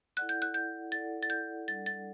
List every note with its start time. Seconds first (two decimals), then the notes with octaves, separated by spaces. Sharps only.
0.17 E4 A4 D5 F#5 F#6
0.29 G6
0.42 F#6
0.54 G6
0.92 E4 A4 D5 F#5 A6
1.23 A6
1.30 G6
1.68 G3 D4 A4 D5 F#5 A6
1.86 A6